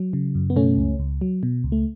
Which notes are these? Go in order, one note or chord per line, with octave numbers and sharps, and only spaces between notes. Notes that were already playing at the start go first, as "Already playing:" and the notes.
Already playing: F#3
C#3
F#2
B3
B2 A3 C#4
C#2
C#2
F#3
B2
C#2
A3